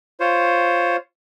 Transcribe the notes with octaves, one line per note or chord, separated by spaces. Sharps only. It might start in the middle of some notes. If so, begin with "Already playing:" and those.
F4 C5 C#5